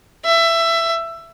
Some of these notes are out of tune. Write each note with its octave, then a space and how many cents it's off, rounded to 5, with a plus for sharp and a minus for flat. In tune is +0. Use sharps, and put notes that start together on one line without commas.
E5 +20